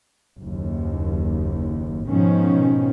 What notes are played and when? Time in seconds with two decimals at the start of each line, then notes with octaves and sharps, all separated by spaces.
0.39 F#1 D#2
2.07 G#2 B2 D#3 F3 C#4